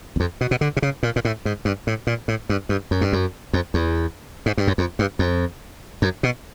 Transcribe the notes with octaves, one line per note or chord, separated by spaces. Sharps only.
E2
F2
B2
B2
D3
C3
C#3
A#2
A#2
A2
G#2
G2
A2
A#2
A2
G2
G2
F#2
G2
F#2
F2
E2
G#2
G2
F#2
F2
G2
F2
F#2
B2